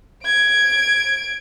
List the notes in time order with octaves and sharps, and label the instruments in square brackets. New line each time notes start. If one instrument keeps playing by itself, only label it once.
[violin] G#6 D7